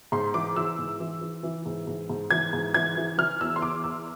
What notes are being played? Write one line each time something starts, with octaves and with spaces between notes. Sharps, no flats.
G#2 C6
E3 D6
E3 E6
G#2
E3
E3
E3
G#2
G#2
G#2
E3 G#6
G#2
E3 G#6
E3
E3 F6
E2 E6
C6
E2 D6
E2 E6